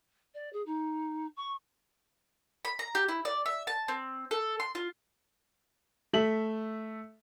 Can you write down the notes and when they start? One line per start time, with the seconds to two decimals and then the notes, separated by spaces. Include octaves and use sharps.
0.34 D5
0.52 G#4
0.66 D#4
1.36 C#6
2.65 B5
2.79 A#5
2.95 G4
3.08 E4
3.25 D5
3.46 E5
3.67 A5
3.88 C4
4.31 A4
4.60 C6
4.75 F4
6.13 A3 E5 F#7